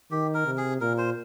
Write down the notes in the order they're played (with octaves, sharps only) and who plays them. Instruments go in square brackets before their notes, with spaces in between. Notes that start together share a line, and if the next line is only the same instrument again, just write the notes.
[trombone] D#3 [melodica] G4
[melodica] A#4
[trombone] C3
[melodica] G#4
[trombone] A#2 [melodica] A#4
[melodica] C5